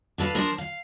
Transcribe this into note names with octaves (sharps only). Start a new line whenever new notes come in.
D4 A4 B4 F5
F3 D4 A#4 C5
F5